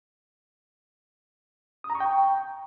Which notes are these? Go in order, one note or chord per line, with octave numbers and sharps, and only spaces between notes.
D#6
A#5
C#6
G5